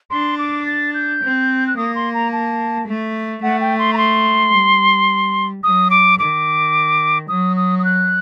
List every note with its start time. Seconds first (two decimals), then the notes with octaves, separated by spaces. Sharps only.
0.10 D4 C6
0.38 D6
0.66 A6
0.94 G6
1.21 C4
1.67 F#6
1.77 A#3 D#6
1.95 C6
2.14 A#5
2.32 A5
2.87 A3
3.42 A3 F#5
3.61 G5
3.78 C6
3.93 A#5
3.97 C6
4.52 G3
5.63 F#3 D#6
5.90 D6
6.18 D#3 D6
7.28 F#3 D#6
7.57 D#6
7.79 D#6
7.84 F#6